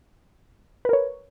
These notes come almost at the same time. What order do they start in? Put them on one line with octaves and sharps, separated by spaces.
B4 A#4 C#5